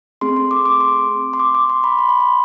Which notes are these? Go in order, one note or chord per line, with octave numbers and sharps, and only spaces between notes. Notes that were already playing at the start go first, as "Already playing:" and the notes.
A3 C4 G#4 C6
C6
D6
D6
C6
C6
D6
D6
C6
B5
C6
B5
C6